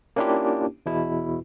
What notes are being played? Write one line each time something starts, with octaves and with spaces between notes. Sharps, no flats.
A#3 C#4 D4 E4 F4 G4
E2 B2 E4